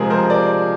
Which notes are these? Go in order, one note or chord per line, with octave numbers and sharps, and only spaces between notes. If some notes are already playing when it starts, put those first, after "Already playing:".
Already playing: C3 F3 G#3 G#4 A#4
A#4 C5
C5 D5